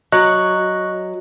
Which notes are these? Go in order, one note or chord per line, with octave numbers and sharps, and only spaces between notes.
F#3 D#5 C#6 F#6